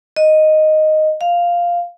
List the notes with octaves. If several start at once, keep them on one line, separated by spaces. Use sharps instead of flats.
D#5
F5